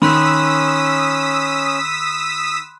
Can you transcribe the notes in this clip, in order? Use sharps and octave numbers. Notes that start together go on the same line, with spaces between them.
D#3 C#4 B5 C6 D#6 E6 F#6 B6